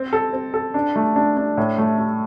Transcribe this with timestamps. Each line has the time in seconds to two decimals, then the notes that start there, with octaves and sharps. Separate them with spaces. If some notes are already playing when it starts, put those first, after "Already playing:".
Already playing: C4
0.13 A4
0.33 C4
0.54 A4
0.74 D4
0.96 A3
1.16 D4
1.37 D4
1.57 A2
1.78 A3
1.98 A3